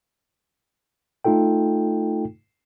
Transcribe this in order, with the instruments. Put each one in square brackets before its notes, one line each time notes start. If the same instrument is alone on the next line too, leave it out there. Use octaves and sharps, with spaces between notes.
[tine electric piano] A3 D#4 F4 A4 G5